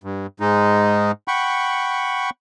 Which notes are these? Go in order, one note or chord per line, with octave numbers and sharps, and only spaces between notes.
G2
G#2 G#3 D#4
F#5 G5 B5 C#6